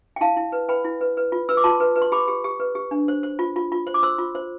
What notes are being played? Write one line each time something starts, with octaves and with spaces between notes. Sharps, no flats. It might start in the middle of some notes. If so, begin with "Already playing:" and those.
G5
E4 F5 A5
E4
B4
B4 G5 B5
E4
B4
B4
F4
B4 E6
D6
F4 A5 C6
B4
B4
C6
G4 B5 D6
G4
G4
B4
G4
D4
C5
C5
F4
F4
F4
C5
D6
C5 C6 E6
F4
C5